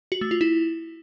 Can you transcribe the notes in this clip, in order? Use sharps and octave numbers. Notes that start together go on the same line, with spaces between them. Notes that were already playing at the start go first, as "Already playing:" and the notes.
F#4
A3
F4
E4